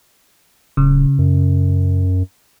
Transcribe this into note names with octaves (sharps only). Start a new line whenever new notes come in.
D1 C#3
F#2